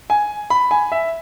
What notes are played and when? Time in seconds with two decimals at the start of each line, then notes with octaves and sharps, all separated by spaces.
0.10 G#5
0.50 B5
0.71 G#5
0.92 E5